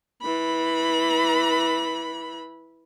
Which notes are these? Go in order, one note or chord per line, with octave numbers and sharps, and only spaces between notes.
E3 B5